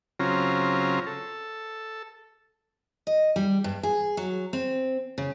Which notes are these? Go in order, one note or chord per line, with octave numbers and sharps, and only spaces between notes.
C#3 F#3 C4 C#4 F4 A#5
A4
D#5
G3
G2
G#4
F#3
C4
C#3